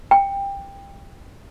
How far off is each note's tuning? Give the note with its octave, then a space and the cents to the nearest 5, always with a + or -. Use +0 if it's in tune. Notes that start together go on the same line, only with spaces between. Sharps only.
G5 +15